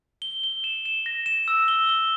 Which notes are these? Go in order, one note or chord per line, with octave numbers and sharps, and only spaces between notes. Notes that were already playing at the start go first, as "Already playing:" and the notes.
G7
G7
E7
E7
A#6
E7
E6
G7
G7